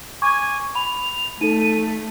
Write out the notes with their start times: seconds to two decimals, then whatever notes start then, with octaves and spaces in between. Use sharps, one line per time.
0.22 G#5 C#6 D6 G#6
0.75 B5 F7
1.41 A3 D#4 A4 D#7